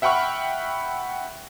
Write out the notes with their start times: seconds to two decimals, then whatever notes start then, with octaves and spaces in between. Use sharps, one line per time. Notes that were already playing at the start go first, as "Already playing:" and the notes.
0.02 E5 F#5 G5 B5 C#6 F6